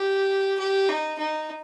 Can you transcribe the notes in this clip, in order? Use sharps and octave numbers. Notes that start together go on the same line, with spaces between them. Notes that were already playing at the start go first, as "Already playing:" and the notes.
Already playing: G4
G4
D#4
D#4